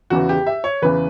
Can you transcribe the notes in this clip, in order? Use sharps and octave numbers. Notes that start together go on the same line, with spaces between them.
E2 C#3 E3 F#4
G4
E5
C#5
E2 C#3 E3 B4